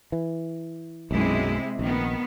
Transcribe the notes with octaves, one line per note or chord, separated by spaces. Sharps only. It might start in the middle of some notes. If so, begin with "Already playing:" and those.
E3
B1 F#2 C3 G#3 E4
A#1 D#3 B3